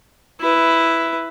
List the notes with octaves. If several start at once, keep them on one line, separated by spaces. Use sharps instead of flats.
E4 B4